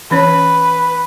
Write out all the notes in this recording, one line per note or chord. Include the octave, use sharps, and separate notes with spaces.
E3 C#4 B4 C#5